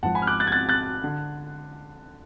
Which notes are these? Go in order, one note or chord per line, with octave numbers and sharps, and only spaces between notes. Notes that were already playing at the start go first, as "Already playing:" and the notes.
G#1 G#2 F3 F#5 A5
G#5 B5
F6
D6 F#6
F#6 A6
G#6
F#6 A6
F#6 A6
D3